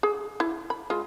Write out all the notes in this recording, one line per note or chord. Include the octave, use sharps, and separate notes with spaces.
G#4
E4
B5
G#3 F4